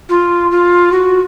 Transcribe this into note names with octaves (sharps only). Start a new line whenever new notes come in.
F4
F4
F#4